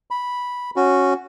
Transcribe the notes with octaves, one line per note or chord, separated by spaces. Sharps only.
B5
C#4 F#4